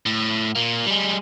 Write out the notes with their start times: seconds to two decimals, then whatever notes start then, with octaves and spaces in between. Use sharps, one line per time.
0.06 A2
0.55 A#2 A#3
0.86 G3 G#3